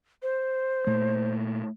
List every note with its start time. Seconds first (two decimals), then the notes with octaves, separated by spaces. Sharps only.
0.23 C5
0.87 A#2 A3